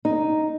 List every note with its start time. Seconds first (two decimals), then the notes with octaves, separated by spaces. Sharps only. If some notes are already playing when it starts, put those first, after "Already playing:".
0.05 D#4